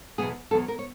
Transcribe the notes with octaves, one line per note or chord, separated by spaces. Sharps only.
E2 B2 F#3 B3 G#4
E2 B2 F#3 B3 A4
A#4
C#5